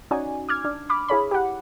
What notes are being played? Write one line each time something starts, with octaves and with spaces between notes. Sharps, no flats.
C#4 D#4 F#4 D5 G#5
D6 F6 G#6
D4
B5 D6 F6
E4 G#4 C#5 B5
G4 F#5